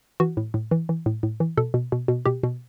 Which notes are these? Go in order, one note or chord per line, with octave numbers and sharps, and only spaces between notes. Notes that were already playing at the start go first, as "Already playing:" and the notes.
E3 F#4
A2
A2
E3
E3
A2
A2
E3
B2 A4
B2
B2
B2
B2 G4
B2